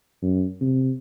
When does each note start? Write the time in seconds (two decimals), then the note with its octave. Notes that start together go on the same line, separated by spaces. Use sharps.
0.22 F#2
0.61 C3